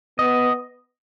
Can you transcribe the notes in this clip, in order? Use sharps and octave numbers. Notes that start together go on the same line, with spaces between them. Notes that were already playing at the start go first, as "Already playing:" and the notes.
B3 D#5